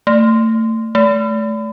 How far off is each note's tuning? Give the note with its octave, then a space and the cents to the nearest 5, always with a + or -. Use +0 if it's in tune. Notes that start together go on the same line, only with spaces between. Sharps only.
A3 +30
A3 -20